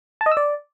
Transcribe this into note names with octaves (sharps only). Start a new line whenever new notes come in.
A5
D#5
E6
D5